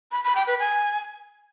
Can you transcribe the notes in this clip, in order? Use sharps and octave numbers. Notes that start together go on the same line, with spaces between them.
B5
B5
G5
B4
G#5